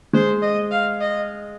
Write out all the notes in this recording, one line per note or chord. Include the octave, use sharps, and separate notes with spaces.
G#3 C5
D#5
F5
D#5